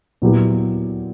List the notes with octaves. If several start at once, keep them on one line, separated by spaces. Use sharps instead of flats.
A#2 F#3 B3 E4 G4